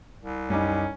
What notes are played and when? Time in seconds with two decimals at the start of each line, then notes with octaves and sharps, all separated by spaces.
0.23 C2
0.50 F#2 G3 C#4 D#4 D6